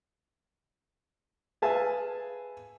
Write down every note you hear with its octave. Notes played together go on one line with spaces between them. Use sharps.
G#4 B4 E5 F5 G#5 A5